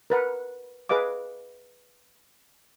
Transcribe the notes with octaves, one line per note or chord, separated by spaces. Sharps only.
A#4 B4 F#5
G#4 B4 D#5 F5 D6